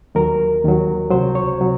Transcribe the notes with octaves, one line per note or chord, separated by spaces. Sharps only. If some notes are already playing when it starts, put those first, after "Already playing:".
D#2 D#3 F#3 A#4
D#2 D#3 F#3
C#2 C3 F#3 C5
C#5
C3 F#3